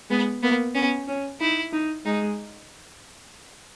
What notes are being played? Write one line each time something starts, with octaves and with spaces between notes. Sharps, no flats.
G#3 B3
A#3 B3
B3 C#4
C#4
D#4 E4
D#4
G#3 D#4